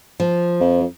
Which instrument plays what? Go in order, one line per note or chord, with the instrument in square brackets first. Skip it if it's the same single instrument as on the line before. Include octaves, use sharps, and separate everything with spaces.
[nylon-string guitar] F3
[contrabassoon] F2